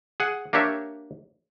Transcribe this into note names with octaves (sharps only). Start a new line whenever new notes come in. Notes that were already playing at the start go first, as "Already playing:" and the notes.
G#4 F#5
A#3 D4 G4 C#5 E5